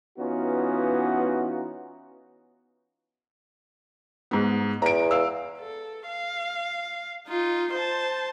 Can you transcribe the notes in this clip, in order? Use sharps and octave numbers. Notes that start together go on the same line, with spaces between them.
E3 B3 C#4 D#4 F4 F#4
G#2 B3
E2 A#5 D7
F5 E6
A4
F5
D#4 F4
C5 A5